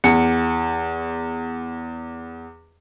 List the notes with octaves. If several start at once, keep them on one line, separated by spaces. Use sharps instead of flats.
E2 C#7